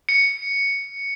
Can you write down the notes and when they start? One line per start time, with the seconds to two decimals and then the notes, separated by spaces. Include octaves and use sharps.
0.09 C#7